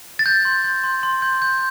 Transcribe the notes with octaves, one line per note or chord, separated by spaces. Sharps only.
A6
G6
C6
G6
C6
C6
G6
G6